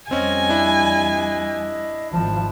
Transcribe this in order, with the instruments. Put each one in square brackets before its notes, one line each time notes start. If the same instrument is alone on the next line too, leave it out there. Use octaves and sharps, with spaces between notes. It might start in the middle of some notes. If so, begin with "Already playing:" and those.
[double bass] F2 G3 [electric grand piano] C4 C#4 [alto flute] D#5 [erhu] G#5
[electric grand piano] D4 E4
[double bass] G#1 F3 [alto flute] A5